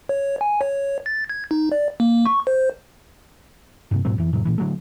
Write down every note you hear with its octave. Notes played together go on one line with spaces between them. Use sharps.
C#5
G#5
C#5
A6
G#6
D#4
D5
A#3
C#6
C5
G2 C3
G#2 B2 F#3 C4
F2 E3
F2 A2 C3 F#3
A#2 E3
D3 F#3 A3